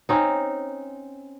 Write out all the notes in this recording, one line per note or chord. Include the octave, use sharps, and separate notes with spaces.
C4 C#4 D#4